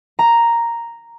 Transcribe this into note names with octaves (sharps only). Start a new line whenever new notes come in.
A#5